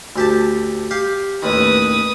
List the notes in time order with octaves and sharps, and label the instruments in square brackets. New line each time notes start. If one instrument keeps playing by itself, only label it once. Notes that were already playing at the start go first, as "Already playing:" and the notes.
[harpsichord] D2 G4 A5
G4 F5
[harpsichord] A1 D#2 D#3 [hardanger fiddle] B4 D#6